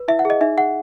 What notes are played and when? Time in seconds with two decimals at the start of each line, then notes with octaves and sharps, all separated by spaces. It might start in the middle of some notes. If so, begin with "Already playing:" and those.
Already playing: B4
0.08 E4 E5
0.19 F#5
0.25 G#4 D#5
0.41 D#4 E5
0.57 G#4 F#5